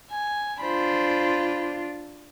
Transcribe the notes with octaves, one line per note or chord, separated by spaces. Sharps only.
G#5
D4 F4 C5 B5